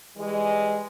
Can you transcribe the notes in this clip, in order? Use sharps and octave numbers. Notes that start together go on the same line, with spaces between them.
E3 G3 G#3